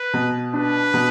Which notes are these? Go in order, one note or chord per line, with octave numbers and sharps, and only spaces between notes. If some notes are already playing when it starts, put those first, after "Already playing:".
Already playing: B4
B2
D4 B4
B2